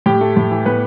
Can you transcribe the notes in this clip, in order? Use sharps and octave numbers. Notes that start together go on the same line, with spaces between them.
A2 G4 G5
A3
A2
E3
A2 B3 B4